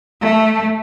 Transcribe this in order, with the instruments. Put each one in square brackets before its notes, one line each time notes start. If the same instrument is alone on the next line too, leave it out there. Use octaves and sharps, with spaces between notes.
[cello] A3